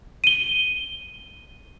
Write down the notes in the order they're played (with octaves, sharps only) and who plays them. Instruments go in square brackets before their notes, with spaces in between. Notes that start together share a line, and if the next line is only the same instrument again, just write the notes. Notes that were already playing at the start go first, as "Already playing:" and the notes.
[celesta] D#7 G7